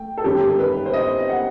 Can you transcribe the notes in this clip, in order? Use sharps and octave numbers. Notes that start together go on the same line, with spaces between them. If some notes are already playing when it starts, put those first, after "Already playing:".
Already playing: A3 G5
A4
G1 F#2 D#3 G4
B4
C5
D#5
F#5